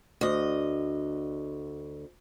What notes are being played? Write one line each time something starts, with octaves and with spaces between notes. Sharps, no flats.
D2 D#5